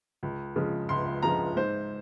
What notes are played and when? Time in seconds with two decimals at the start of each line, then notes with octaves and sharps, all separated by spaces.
0.23 C#2
0.56 C#3 F3 G#3
0.89 C#2 C6
1.22 C#3 F3 G#3 A#5
1.57 G#2 C5